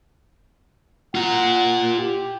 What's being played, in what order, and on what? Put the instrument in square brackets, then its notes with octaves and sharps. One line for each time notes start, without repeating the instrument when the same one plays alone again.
[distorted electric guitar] F4 A#5 [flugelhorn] F#5
[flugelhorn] G4